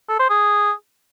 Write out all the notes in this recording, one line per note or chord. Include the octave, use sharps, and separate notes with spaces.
A4
C5
G#4